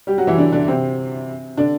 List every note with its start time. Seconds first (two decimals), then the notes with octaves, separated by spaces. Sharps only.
0.07 G3 G4
0.18 F#3 F#4
0.27 E3 E4
0.38 D3 D4
0.52 D3 D4
0.68 C3 C4
1.57 D3 D4